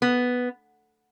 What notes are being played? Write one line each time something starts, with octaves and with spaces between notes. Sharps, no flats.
B3